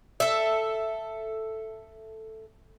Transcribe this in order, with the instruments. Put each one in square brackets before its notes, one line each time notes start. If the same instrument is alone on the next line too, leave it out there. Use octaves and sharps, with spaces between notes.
[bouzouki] A4 E5